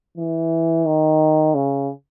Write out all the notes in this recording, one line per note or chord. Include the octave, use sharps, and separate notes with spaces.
E3
D#3
C#3